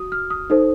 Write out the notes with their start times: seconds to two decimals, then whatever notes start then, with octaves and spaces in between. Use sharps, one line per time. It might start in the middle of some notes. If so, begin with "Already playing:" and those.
Already playing: F#4 D#6
0.12 F6
0.30 D#6
0.50 D#4 A4 C5